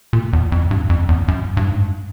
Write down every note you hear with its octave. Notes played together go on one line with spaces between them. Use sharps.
A#2
E2
F2
G2
F2
E2
F#2
G2
G#2